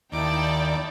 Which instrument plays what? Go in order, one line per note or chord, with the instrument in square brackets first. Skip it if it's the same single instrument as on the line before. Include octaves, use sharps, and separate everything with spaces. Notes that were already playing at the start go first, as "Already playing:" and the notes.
[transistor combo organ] D#2 [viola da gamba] D#4 E4 [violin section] D5 G5 A5 [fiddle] D6